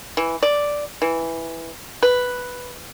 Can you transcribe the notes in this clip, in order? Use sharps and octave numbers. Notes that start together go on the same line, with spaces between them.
E3
D5
E3
B4